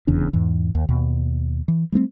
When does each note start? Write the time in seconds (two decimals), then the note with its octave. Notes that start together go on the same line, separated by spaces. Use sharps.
0.07 F1 E2 C#3 D4
0.33 E2 G#2 E3
0.75 D#2
0.89 D#2 B2
1.68 E3
1.92 G3 A3 B3 C4